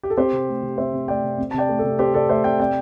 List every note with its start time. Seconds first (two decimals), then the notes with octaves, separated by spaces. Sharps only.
0.03 G4
0.10 A4
0.17 C4 G4 C5
0.33 C3
0.48 A3
0.63 C3
0.78 C4 C5 E5
0.93 C3
1.08 A3 D5 G5
1.23 C3
1.38 C4
1.51 A5
1.54 C3 D5 G5
1.69 A3
1.79 A4
1.84 C3
1.99 C4 G4 C5
2.14 C3 A4 D5
2.29 A3 C5 E5
2.44 C3 D5 G5
2.60 C4 D5 G5